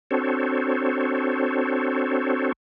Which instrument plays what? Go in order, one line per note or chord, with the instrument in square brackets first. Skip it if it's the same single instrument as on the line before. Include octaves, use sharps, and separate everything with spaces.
[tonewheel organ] C4 D4 F#4 A4 C5 C#5